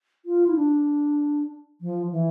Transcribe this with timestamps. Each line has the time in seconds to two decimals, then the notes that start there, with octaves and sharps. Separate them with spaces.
0.25 F4
0.47 E4
0.56 D4
1.81 F3
2.12 E3